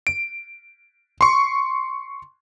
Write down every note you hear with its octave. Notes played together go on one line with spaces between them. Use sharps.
D7
C6 C#6